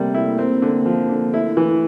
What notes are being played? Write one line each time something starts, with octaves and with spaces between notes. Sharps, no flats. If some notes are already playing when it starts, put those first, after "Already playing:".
Already playing: C3 G3 A3 A#3 A4 A#4
E4
A#3 C4 A#4
D3
F3
D3
A3 E4 A4
E3